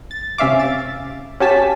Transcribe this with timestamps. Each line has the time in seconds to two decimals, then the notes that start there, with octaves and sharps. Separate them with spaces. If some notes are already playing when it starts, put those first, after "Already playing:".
0.11 A6
0.38 C3 C#4 E5 F5 D6
0.59 A6
1.40 C#4 F#4 G4 G#5 A5 B6